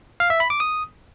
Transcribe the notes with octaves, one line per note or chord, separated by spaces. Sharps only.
F5
E5
B5
D6
D#6